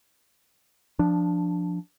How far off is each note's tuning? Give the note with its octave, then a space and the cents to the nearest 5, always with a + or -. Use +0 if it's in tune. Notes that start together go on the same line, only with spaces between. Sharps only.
F3 +0 D4 +0